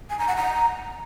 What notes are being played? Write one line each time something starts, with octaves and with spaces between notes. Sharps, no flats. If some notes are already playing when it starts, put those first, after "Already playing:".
G#5
A#5
F#5
A#5